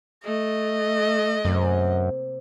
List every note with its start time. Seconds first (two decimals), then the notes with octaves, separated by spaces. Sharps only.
0.25 A3 D#5
1.45 F#2 C3 A#3 C4